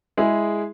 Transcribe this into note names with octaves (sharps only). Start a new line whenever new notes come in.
G#3 E4 G#4